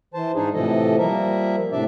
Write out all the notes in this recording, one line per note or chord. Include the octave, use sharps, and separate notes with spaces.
E3 C5 A5
G#2 D4 D#4 G#4
A2 C3 E3 F3 A4 D#5
F3 G3 A#3 A#4 E5
A2 C3 D4 D5 E5